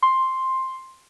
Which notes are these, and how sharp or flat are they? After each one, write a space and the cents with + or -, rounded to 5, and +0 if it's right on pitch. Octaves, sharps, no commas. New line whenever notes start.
C6 +5